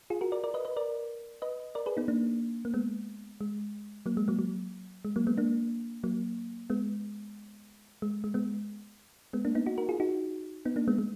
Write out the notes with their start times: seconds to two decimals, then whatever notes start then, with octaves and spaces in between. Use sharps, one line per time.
0.10 F4 G#4
0.21 F#4 A#4
0.32 A#4 D5
0.44 A#4 D5
0.54 B4 D#5
0.65 B4 D#5
0.77 A#4 D5
1.42 B4 D#5
1.75 A#4 D5
1.86 G#4 B4
1.97 B3 D#4
2.08 A#3 D4
2.65 A#3
2.74 G#3 B3
3.41 G#3
4.06 F#3 A#3
4.17 G#3
4.28 F#3 A#3
4.39 F#3
5.05 G#3
5.16 F#3 A#3
5.27 G#3 B3
5.38 A#3 D4
6.04 F#3 A#3
6.70 G#3 B3
8.02 G#3
8.24 G#3
8.34 G#3 B3
9.33 G#3 B3
9.45 A#3 D4
9.55 B3 D#4
9.66 D#4 F#4
9.78 F#4 A#4
9.89 F4 G#4
10.00 D#4 F#4
10.65 B3 D#4
10.76 A#3 D4
10.88 G#3 B3
10.98 G#3